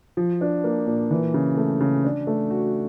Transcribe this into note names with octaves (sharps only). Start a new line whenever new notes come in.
F3
D4
A#3
A#2
E3
C#3
A3
C#3
D4
A3
F#4